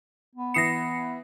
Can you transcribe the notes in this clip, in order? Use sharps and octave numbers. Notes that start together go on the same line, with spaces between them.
B3
E3 D#6 A#6 C7 C#7 E7